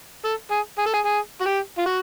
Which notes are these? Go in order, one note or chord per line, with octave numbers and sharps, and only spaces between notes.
A4
G#4
G#4
A4
G#4
G#4
F#4
G4
F4
F#4